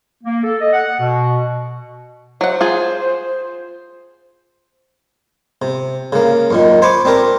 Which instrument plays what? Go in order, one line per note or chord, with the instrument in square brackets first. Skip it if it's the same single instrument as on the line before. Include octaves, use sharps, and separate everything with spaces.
[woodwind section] A#3
A4
D#5
F#5
B2
[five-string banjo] F#3 F#5 [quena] C5
[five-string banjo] F4 G#4 G#5
[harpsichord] C3
C#3 A#3
F#2 A#2 D#3
C5 G#5 B5 C#6 D6
C4 D4 G4 A#4